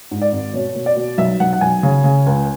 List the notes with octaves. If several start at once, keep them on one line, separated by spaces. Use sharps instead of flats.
G#2
D5
G#1
B2 C#5
B2
D5
B2
B1 E5
B1 F#5
F#5
B1 G#5
C#3
C#3
C#2